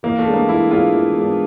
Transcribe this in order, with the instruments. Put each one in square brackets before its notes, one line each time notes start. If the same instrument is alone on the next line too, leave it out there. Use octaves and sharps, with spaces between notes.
[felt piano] E3 [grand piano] A#3
[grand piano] A3
[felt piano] G#3 B3 D4
[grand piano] A#3
[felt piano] E3 [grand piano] E4
[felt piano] G#3 B3 D4 [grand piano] F4
[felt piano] E3
G#3 B3 D4